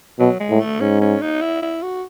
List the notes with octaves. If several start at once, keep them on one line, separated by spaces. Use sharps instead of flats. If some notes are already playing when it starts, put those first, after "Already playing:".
B2 F#3
G#3
A2
A3
G#2 C#4
C#4
D#4
E4
E4
F#4